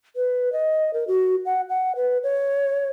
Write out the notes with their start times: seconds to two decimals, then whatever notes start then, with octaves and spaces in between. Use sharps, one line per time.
0.16 B4
0.53 D#5
0.94 A#4
1.08 F#4
1.46 F#5
1.69 F#5
1.96 B4
2.23 C#5